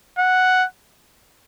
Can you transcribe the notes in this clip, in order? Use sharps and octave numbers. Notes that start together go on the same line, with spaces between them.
F#5